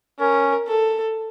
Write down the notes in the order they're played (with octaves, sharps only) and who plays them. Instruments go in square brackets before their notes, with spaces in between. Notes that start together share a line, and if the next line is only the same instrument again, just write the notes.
[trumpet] C#4 [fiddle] A#4
[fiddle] A4